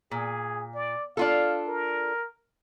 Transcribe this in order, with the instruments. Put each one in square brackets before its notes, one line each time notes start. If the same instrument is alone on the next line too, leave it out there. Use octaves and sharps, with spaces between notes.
[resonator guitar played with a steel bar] A#2 [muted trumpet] G#4
[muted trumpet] D5
[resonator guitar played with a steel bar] D4 F4 A4 [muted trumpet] F5
[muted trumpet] A#4